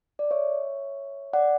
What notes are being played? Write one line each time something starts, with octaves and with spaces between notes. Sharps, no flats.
D5
C#5 E5
D5 F#5